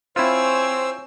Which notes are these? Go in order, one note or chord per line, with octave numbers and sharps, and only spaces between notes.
C4 E4 F4 C5 C#5 G#5 E6